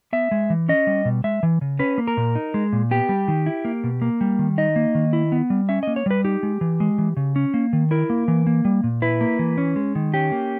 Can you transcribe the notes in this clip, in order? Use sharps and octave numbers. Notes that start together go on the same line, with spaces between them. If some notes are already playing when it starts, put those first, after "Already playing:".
B3 E5
G#3
E3
C#4 D#5
G3
B2
G#3 E5
E3
C#3
C#4 B4
A#3
A#4
A#2
D#4
G#3
A#2
B3 G4
G3
D#3
E4
A#3
B2
A#3
G3
D#3
D#4 D#5
A#3
D#3
E4
B3
G3
C#4 E5
A#3 D#5
C#5
G3 B4
D#4 G4
G#3
E3
G#3
E3
C#3
C#4
A#3
D#3
E4 A#4
A#3
E3
A#3
G3
A#2
E4 B4
A#3
E3
C#4
G#3
D#3
C#4 G4
A#3